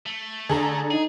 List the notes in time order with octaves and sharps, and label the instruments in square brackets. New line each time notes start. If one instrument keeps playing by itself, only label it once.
[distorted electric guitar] A3
[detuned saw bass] D3 [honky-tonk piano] G#4 A4 A#5
[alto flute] D#4 [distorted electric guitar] G#4